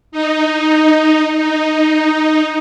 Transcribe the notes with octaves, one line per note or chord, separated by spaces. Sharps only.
D#4
D#4